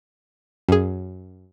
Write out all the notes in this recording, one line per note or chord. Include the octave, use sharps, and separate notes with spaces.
F#2 G#4